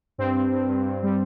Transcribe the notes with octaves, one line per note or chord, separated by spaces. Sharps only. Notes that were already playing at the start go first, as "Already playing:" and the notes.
G2 C4
G2
G2
G2
G2
G3